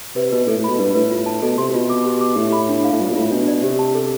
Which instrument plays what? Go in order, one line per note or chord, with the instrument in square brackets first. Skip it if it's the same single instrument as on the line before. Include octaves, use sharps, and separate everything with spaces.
[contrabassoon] C3 [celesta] B4
[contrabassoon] B2 [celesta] B4
[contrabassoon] A2 [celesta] A4
[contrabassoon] A2
[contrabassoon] B2 [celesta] B5
[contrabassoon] G2 [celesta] B4
[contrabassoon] A2 [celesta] B4
[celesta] F4
A5
[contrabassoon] B2 [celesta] A4
[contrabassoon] C3 [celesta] C6
[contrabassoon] B2 [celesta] F4
[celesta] D6
G4
D6
[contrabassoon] A2 [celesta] G4
[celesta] B5
D4
F5
[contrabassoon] A2
[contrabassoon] G2 [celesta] F4
[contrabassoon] B2
[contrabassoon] A2 [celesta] F4
[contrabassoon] B2 [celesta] D4
[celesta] D5
[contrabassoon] C3 [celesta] G4
[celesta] A5
A4